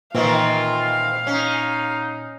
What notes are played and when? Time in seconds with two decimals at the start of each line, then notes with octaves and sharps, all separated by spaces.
0.15 A#2 D#3 E3 C4 F4 F5
1.27 C#4 D#4